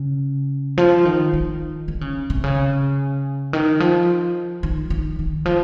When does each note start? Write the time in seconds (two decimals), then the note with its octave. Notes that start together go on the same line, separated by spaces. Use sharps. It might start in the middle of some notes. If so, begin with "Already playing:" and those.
Already playing: C#3
0.78 F3
1.05 D#3
1.33 D#3
1.88 D#3
2.01 C#3
2.30 C3
2.44 C#3
3.53 D#3
3.80 F3
4.63 D#3
4.90 D#3
5.19 D#3
5.46 F3